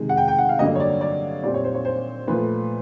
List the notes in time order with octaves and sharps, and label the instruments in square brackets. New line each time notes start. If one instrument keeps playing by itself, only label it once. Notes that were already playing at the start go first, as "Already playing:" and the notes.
Already playing: [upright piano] C3 D#3 G#3
F#5
G5
G5
F#5
F5
G2 D3 F#3 A#3 D#5
C#5
D5
D5
A#2 G3 C4 D5
C#5
C5
C#5
C5
A#2 F3 A3 B4